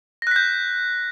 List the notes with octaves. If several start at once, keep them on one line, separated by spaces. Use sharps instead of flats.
F#6 G6 A#6 B6